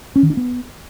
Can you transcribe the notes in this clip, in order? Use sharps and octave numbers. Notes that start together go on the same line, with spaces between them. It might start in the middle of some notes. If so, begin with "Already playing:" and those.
C#4
D#3
D4
B3